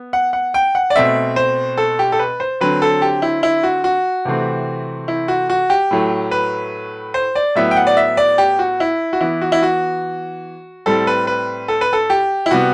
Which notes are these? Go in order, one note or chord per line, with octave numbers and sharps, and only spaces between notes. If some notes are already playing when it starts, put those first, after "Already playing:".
Already playing: B3
F#5
F#5
G5
F#5
D5
B2 A3 C4 E5
C5
A4
G4
A4
B4
C5
D3 F#3 C4 B4
A4
G4
E4
E4
F#4
F#4
C3 E3 A3 C4
E4
F#4
F#4
G4
A2 F#3 A3
B4
C5
D5
A2 F#3 B3 E5
G5
F#5
D5
E5
D5
G4
F#4
E4
F#4
E3 B3 E4
F#4
E4
F#4
A2 G3 C4 A4
B4
B4
A4
B4
A4
G4
E4
C3 G3 B3 F#4